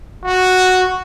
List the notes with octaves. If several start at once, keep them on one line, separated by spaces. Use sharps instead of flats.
F#4